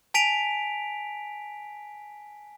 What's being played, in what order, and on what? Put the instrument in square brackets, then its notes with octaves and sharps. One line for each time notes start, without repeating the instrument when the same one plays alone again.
[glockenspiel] G#5 A5 B6 D7 F7